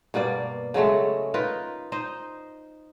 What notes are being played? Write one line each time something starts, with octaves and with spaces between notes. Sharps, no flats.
G2 B2 A#3 D5
C#3 F#3 G#3 A3
D#4 F4 A#4 B4
D#4 C5 D#5